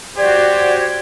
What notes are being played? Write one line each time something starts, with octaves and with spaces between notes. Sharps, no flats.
F#4 G4 C5 D5 G#6